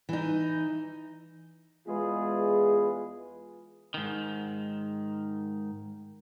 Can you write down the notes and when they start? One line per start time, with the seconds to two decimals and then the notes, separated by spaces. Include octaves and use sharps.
0.09 E3 D#4
1.88 E2 G#3 F4 G#4 B4
3.94 G#2 D#3